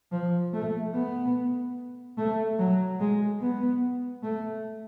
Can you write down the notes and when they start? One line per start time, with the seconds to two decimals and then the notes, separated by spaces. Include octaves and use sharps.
0.12 F3
0.53 A3
0.94 B3
2.18 A3
2.58 F#3
3.00 G#3
3.41 B3
4.23 A3